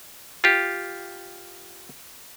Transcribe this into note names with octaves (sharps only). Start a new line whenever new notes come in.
F4 G4